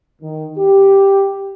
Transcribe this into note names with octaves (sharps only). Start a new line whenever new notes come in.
D#3
G4